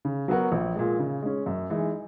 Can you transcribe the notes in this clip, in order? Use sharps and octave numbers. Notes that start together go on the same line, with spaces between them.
C#3
F#3 B3 F#4 A#4
A#1
A#2 G#3
C#3
G#3 C#4
F#2
E3 G#3 D#4